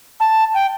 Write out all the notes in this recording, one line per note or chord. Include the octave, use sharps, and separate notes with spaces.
A5
G5